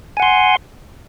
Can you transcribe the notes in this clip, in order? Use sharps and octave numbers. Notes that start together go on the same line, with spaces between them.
F#5 G#5 C6